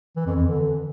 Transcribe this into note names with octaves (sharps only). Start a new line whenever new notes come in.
E3
F2
E3
D3